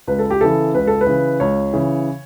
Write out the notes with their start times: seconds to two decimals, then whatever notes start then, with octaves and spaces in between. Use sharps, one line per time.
0.07 C#2 B4
0.19 A4
0.30 G4
0.41 C#3 E3 A4
0.75 C#2 B4
0.87 A4
1.01 B4
1.07 C#3 E3
1.40 C#2 C#5
1.73 C#3 E3